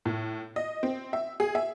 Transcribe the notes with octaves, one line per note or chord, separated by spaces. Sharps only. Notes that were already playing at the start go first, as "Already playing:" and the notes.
A2
D#5
C4
E5
G#4
E5